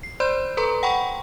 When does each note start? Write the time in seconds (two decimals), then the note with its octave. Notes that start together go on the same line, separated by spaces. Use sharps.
0.03 C7
0.20 C5 D5 B5 C6 G6
0.57 A4 B4 A#5 C6
0.83 F#5 G5 B5 C#6